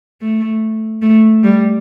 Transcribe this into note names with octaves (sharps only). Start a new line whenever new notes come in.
A3
A3
G3